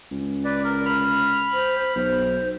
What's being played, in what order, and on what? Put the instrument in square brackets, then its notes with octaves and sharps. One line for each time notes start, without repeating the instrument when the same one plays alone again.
[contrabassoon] C#2
[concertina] B4 D5
A#4
B5 F6
[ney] C5
[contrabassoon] B1 [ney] C5